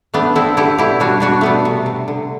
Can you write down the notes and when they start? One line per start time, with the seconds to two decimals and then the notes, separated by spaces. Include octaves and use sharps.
0.14 A3 B3 D4
0.35 D3 C4 E4
0.57 D3 E4 G4
0.78 B2 E4 G4
1.00 G3 D4 F#4
1.20 B2 D4 F#4
1.41 A3 B3 D4
1.65 C3
1.86 C3
2.08 D3